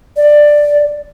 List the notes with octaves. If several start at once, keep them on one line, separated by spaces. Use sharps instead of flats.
D5